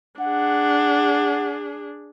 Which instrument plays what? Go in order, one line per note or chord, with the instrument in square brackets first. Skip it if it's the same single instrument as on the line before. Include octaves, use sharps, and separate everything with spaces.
[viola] D4 G#4 [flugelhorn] F#5